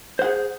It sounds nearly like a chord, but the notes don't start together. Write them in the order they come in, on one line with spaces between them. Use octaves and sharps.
C5 F#5 G#4